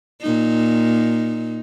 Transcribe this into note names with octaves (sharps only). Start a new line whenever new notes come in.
A#2 D#4